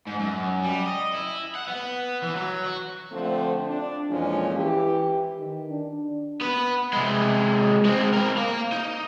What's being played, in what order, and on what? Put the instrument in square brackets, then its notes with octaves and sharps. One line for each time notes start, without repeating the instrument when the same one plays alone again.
[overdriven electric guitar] G#2
F#2
G3
D#5
E4
F#5
B3
E3
F#3
F#4
[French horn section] D3 F3 A3 C4
D4
F2 A#2 E3 F3 G#3 C#4
E3 G4
[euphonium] D#3
D4
[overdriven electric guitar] B3 B4
C3 G#3
G#3 C4
C4 A#4
F5 A#5
D#4